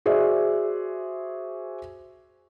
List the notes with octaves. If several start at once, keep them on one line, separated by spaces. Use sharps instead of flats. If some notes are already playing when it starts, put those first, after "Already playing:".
F#4 G#4 C5 D5 E5